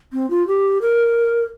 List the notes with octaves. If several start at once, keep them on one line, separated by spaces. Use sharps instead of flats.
C4
F4
G4
A#4